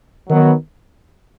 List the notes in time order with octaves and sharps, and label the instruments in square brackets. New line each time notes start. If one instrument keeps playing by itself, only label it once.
[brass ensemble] D#3 F#3 B3